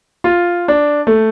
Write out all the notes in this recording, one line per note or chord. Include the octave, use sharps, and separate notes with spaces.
F4
D4
A3